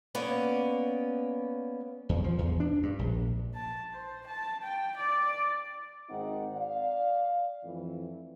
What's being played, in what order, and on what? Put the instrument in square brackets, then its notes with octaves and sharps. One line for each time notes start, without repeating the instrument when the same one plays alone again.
[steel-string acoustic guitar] A#3 B3 C#4 C#5 D5
[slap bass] E2
F3
E2
D4
G2
A#1
[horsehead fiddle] A5
C5
A5
G5
D5
[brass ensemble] G#1 C4 D#4 F#5
D5 F5
F2 A2 E3